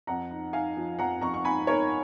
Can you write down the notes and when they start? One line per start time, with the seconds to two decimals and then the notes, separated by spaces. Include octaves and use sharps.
0.07 F2 F#5 A#5
0.31 D#4
0.53 D#4 F5 G#5
0.77 F3
0.99 F2 F#5 A#5
1.21 F2 A#5 C#6
1.34 C#6
1.45 D#4 G#5 B5
1.67 D#4 A#4 C#5